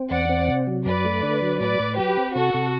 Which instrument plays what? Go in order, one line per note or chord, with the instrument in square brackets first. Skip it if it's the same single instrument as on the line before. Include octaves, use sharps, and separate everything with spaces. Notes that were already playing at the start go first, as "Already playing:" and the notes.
Already playing: [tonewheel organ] C4
[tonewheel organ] E2 [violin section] D5 F#5
[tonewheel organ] C4
C3
F#3
[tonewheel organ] F#2 [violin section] B4 D5
[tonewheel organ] A3
D3
F#3
[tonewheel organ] A2 [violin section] B4 D5
[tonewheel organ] A2
[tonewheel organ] F#3 [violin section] G4 B4
[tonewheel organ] C4
[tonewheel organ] C3 [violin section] F#4 A4
[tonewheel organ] C3